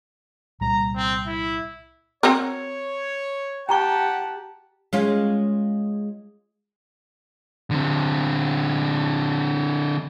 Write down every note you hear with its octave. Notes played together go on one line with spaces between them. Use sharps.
C2 A#2 G3 A#5
C4
E4
C4 F#4 A#4 C#5
G4 F#5 G5 A5 A#5 C#6
G#3 C#4 F4
D3 C4